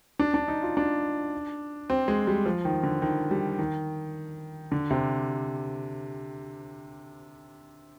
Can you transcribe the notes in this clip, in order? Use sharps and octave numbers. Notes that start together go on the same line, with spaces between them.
D4
D4
D#4
F4
D4
C4
G#3
G3
F3
D#3
D3
D#3
G3
D#3
D3
C3